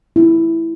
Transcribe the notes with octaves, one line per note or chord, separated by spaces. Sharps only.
E4